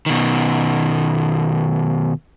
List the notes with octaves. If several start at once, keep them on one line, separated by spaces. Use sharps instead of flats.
B2 D#3